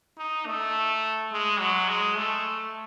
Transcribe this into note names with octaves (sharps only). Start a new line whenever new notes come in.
D#4
A3
G#3
F#3
G#3
A3